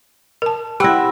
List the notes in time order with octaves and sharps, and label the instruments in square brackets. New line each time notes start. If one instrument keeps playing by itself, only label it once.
[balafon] A#4 A5
[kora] C4 E4 [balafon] G4 [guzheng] F#5 [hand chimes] B5 E6 A#6